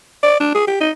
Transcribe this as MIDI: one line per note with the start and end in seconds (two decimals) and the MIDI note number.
0.23 0.35 74
0.40 0.51 62
0.54 0.65 68
0.67 0.76 67
0.80 0.91 63